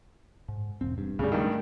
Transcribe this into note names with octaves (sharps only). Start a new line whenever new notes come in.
G#2
E1 C4
G2
D2 G#2 C#3 G3
G2 D#3 A3